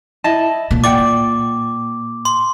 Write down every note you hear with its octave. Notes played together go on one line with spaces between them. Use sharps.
E4 D#5 A5
A#2
D5 F#5 G5 D6
C6